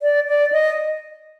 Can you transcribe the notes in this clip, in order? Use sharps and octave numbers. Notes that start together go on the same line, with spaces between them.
D5
D5
D#5